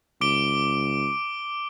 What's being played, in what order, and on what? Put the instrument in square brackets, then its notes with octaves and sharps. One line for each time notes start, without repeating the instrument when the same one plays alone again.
[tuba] C#2 [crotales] D6 D7 G7